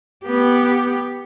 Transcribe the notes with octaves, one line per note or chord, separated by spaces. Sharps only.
B3 G4